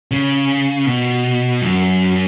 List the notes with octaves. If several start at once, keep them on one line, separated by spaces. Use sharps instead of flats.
C#3
B2
F#2